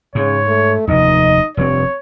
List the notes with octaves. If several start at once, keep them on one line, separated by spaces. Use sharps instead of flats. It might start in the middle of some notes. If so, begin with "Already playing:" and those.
G#2 C#3 C#5
A3
F1 D#2 D#4 D#5
F1 G2 C3 C4 C#5